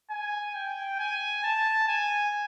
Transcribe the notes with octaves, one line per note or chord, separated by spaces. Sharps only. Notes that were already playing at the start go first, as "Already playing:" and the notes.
G#5
G5
G#5
A5
G#5